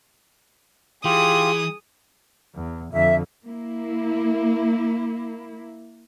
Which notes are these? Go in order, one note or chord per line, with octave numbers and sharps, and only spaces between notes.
E3 F4 G4 G#4 D#6
E2
F2 D3 E5
A#3 E4